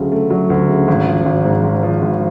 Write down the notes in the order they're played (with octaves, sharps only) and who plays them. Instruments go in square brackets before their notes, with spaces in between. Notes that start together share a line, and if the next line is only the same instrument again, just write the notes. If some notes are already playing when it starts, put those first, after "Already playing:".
Already playing: [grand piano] D2 C#3 F#3 A3
A3
F#3
D2
C#3
G#1
F3
G#1
G#2
G#1
F3
G#1